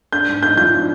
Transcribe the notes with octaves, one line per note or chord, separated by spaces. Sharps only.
D4 G6
G#2
D#4 G6
F3 G6
D4